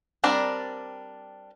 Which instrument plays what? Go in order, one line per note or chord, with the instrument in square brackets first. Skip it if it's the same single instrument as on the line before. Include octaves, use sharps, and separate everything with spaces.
[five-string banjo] G3 C4 D4 A#4 D5